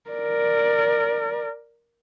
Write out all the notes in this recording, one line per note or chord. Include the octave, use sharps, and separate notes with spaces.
A#4 D5